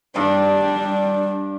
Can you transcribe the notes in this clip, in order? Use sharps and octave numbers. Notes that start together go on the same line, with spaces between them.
G2 G3 D4